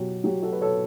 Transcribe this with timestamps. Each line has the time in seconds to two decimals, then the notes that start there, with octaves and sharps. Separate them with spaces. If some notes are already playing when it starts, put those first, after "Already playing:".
Already playing: B2 F#3 G4
0.24 F#3 G4
0.43 F#4 A4
0.53 B4
0.61 A4 C#5